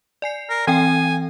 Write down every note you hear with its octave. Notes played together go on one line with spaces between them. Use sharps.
D5 G#5 C7
A#4
E3 C4 G5 G#5